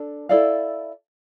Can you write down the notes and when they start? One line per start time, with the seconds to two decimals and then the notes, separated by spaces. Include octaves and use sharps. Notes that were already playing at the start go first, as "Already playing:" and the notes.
Already playing: D4 A4
0.29 E4 A4 D5 F5